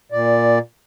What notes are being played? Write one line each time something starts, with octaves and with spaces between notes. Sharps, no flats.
A#2 D5